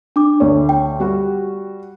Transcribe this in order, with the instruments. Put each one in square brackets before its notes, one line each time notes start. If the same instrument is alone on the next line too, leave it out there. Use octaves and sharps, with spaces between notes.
[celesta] D4 D6
[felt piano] D2 C#5
[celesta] G5
[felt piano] G3 F#4